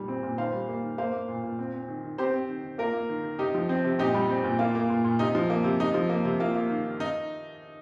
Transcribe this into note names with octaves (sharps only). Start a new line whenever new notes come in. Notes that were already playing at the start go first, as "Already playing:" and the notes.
Already playing: A#2 D#3 G3
C4
A#2
D#3 C5 F5
G3
A#3
D#3
A#3 C5 F5
A#3
A#2
A#2
C4
C4
D#3
D#3
C4 G4 C5
C4
D#3
D#3
A#3 F4 A#4
A#3
D#3
D#3
C3 D#4 G4
F3
C4
C3
A#2 D#4 G4
G3
C4
A#2
A#3 F4
A#3
A#2
A#2
C3 D#4
F3
A#3
C3
C3 D#4
F3
A#3
C3
A#3 F4
A#3
D#3
D#3
D#3 D#4